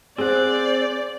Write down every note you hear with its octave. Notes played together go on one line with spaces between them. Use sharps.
C4 G#4 C5 D5 F#5